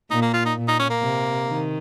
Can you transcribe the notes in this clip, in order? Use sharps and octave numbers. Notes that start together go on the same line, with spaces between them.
A#2 D#4
A#3
F4
D#4
A#2
D#4
C#4
A#3
C3
D#3